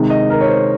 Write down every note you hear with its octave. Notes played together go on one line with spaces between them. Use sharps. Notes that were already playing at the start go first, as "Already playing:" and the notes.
Already playing: C3 D#3 G#3
D#5
A#4
C#5
C5